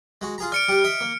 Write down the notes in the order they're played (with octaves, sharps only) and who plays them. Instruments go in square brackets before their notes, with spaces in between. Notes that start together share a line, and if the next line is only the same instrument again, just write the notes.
[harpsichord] G#3 F#4
F4 G#4 A#5
[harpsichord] D5 [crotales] F6 C#7 D7
[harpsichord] G3 G4 [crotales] D7
[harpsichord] D#5 E5
A#3